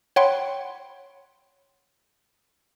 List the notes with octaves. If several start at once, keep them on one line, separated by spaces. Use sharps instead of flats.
C#5 F#5 G5 B5 C6